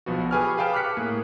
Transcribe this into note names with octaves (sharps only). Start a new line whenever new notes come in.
B1 F3 B3 F#4
G4 G#4 B4 G#5 C#6 F6
G#4 B4 F5 G5 A5 F6
D6 F6 F#6 B6 C#7
A2 A#3 G#4